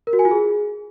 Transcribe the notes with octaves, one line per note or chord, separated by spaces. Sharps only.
A#4
F#4
G#5
F4
G#4